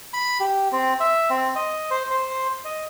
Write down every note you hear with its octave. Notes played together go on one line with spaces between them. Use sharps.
B5
G4
C4
E5
C4
D#5
C5
C5
D#5